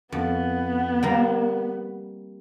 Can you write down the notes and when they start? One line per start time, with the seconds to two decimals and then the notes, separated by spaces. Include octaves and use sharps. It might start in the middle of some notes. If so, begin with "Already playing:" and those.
0.12 F2 B3
1.03 G3 A#3 A#5